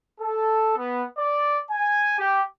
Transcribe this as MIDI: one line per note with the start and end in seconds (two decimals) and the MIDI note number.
0.20 0.77 69
0.78 1.04 59
1.18 1.58 74
1.71 2.17 80
2.19 2.43 67